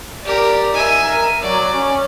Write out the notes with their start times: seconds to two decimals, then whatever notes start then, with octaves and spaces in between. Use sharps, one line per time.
0.25 G4 A#4 D5
0.74 D#4 E5 G#5
1.07 A#4
1.42 F#3 D5
1.76 C#4